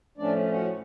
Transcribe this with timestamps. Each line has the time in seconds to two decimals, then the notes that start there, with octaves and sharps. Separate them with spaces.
0.18 A2 F3 A3 C#4 D4 D5
0.53 F#4 F#5